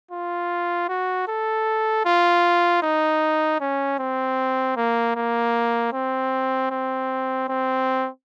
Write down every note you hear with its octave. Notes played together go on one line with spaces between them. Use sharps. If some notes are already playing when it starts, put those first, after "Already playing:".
F4
F#4
A4
F4
D#4
C#4
C4
A#3
A#3
C4
C4
C4